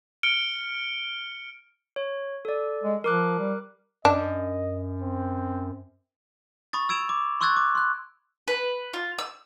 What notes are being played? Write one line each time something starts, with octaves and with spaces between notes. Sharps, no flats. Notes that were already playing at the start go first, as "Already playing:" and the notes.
F6 C#7 D7 G7
C#5
A4 D5
G#3
F3 A#4 D6 F#6
G3
F#2 D4 D#5
C4
B5 C#6 D#6 A6
E6 G#6 D7 E7 F7
D6
C6 C#6 E6 F#6 G#6 A6
D6
C6 F#6
B4
F4
E6